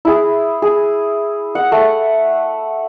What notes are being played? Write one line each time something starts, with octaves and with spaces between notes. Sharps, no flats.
E4 G#4
G#4
F#5
A3